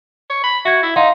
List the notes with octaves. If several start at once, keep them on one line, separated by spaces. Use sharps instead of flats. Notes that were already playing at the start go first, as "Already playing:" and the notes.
C#5
B5
F#4 E5 G#6
E4
D#4 F5 F#5 C6